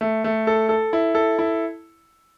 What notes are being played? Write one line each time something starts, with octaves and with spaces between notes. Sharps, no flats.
A3
A3
A4
A4
E4
A4
E4